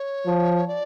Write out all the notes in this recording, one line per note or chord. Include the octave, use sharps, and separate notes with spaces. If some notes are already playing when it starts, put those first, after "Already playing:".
Already playing: C#5
F3
D5